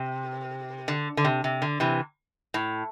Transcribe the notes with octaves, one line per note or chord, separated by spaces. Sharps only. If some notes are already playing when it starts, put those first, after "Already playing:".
Already playing: C3
D3
D3
C3
C3
D3
C3 E3
A2